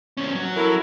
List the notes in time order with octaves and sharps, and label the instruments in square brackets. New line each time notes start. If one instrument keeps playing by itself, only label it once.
[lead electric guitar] E2 C#4
F#3
[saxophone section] E4 A4 A#4